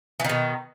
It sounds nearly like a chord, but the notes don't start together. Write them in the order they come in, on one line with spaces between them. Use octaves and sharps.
E3 D#3 B2